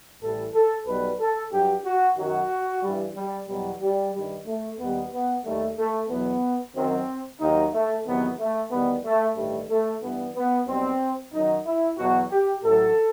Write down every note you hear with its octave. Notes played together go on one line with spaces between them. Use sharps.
A1 A2 E3 G3 A4
A4
B1 B2 G3 B4
A4
G2 F#3 G4
F#4
F#2 D#3 F#3 F#4
G2 E3 G3
G3
E2 B2 F#3 G3
G3
G2 D#3 G3
A3
D#2 D#3 G3 B3
B3
D#2 D#3 G3 A3
A3
E2 B2 F#3 B3
F#2 D#3 F#3 C4
D#2 D#3 F#3 D#4
A3
E2 C3 D#3 F#3 B3
A3
E2 D#3 G3 B3
A3
A1 G2 D#3 G3 A3
A3
G2 E3 G3 B3
B3
B1 B2 G3 C4
F#2 D#3 F#3 D#4
E4
E2 B2 F#3 F#4
G4
A1 A2 F#3 A4